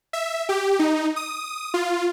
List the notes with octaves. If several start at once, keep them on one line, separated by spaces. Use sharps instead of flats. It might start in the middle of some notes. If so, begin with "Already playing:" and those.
E5
G4
D#4
D#6
F4